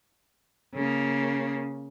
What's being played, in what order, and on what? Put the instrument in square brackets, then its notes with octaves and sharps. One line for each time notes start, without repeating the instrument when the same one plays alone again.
[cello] C#3 A#3